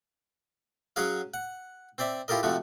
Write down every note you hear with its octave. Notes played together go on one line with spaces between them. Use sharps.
F#3 C#4 F#4 G#4 F5
F#5
C4 C5 D5 E5
E4 F4 G4 A4 A#4 D#5
C3 F3 A3 F#4